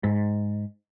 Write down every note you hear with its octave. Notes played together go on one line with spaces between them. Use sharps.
G#2